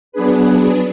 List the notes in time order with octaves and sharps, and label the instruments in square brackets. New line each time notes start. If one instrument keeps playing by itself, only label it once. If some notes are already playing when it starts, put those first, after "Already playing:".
[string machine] F#3 B3 D4 G#4 B4